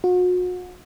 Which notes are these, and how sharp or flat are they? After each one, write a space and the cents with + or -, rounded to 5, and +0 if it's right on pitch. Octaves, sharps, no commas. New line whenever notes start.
F#4 -40